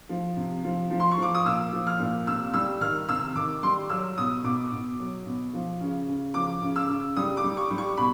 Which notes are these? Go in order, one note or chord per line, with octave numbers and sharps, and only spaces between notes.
F3
C3
F3
F3
C6
C#6
F3 D6
D#6
A#2 E6
F3
F6
A#2
C3 E6
G3 E6
D#3 F6
C3 E6
D#3 D6
G3 C6
F#3 E6
B2 D#6
B2 D6
B2
F#3
B2
F3
C#3
C#3
F3 D6
C#3
E6
C#3
G3 D#6
D6
G3
C#6
G3
C#6
B2 B5